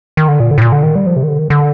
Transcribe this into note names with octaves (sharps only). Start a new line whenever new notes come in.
D#3
D3
A#2
D3
A2
A#2
D3
D#3
G3
F3
C3
D#3
D3
D#3
D3